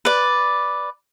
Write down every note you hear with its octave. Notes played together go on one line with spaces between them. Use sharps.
B4 D5